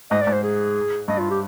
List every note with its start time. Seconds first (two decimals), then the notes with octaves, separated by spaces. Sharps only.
0.11 G#2 D#5
0.21 D5
0.27 G#2
0.32 C5
0.43 G#4
1.08 G2 D#5
1.19 F4
1.30 G4